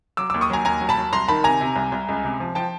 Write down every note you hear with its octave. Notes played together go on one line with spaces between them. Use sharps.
F#3 D6 E6
D#2 D6 E6
C#6 D#6
F#3 G#5 A#5
D#2 G#5 A#5
F#3
A5 B5
F#3
C2 A#5 C6
D#3 A5 B5
C3 G#5 A#5
C3
C2
C2
C#2
C3
F3
F3 G5 A5